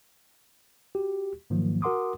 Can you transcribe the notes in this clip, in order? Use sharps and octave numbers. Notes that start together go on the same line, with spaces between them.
F#4 G4
G#2 D#3 F3 F#3 A#3
F#4 A#4 F#5 C6 D6 D#6